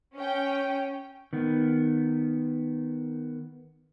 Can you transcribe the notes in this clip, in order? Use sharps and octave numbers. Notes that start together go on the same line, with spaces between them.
C#4 G5
D#3 B3